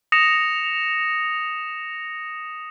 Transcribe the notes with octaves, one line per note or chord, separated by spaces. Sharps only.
D#6 A#6 C#7 E7 F7